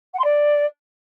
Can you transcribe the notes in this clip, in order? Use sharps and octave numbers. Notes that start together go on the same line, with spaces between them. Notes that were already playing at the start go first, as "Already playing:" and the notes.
F#5
C6
D5